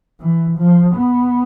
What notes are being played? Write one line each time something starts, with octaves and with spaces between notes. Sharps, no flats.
E3
F3
B3